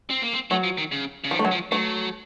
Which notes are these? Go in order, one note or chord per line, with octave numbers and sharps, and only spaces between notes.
C4
A#3
C4
F#3 A3
F3
D#3
C#3
C#3
D#3 F3
A3
F#3
F3
F#3 A3